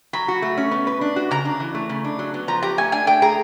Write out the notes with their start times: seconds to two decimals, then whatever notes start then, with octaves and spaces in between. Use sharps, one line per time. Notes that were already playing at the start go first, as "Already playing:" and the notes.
0.13 F#3 B5
0.28 F#4
0.42 A3
0.57 C#4
0.71 B3
0.87 B4
1.01 D4
1.16 F#4
1.31 C#3 A#5
1.45 D4
1.60 E3
1.75 A3
1.89 C#3
2.04 D4
2.19 F#3
2.34 B3
2.48 F3 A#5
2.63 G4 A#5
2.78 A3 G#5
2.92 D4 G#5
3.07 A3 G5
3.22 G#4 A#5